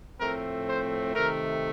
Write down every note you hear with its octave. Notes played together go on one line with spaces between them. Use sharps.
A2 F3 A3 C4 A#4
C5
C3 D#3 A3 A#4